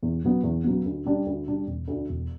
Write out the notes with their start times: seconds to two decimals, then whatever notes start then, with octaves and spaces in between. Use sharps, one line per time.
0.03 E2
0.24 C#3 F#3 B3
0.43 E2
0.64 C#3 F#3 B3
0.85 D2
1.05 C#3 G3 D4
1.26 D2
1.47 C#3 G3 D4
1.67 E1
1.87 D2 D3
2.09 E1